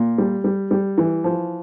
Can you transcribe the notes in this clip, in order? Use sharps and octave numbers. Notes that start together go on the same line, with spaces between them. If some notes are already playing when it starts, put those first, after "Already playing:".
Already playing: A#2
G3
G3
G3
E3
F3